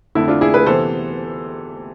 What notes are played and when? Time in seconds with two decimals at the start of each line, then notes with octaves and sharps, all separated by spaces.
0.15 F2 D3 A3 E4
0.28 D4 F4
0.41 E4 G#4
0.54 G#4 B4
0.66 C3 E3 B3 A4 C5